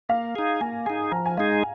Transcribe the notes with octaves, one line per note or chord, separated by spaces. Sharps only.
A#3 F5
D#4 G#4
A#3 G#5
D#4 G#4 G#5
F3 A#5
G#5
G#3 D#4 G#4 F5